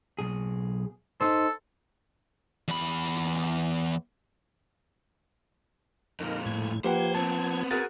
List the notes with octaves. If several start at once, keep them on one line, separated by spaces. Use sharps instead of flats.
B1 G#4
D#4 A4 C5
E2 B5
F2 A#2 D#4 A#4
A2 G#6
F3 A#3 G4 B4 C5 F#5 G5 G#6
B3 C4 A5
F#4 G#4 A#4 G#5 A6